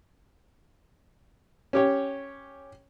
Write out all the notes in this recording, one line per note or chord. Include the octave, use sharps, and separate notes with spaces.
C#4 G4 C#5